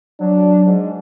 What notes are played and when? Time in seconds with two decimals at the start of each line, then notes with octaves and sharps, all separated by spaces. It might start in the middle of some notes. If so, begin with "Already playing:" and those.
0.20 F#3 D4
0.65 G#2